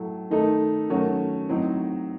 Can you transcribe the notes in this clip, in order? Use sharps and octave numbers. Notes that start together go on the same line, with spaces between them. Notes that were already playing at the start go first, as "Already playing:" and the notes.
Already playing: A2 F#3 A3
D#3 A3 D#4 A4
D#3 F#3 A3 C#4 F#4
A2 F#3 C4 D#4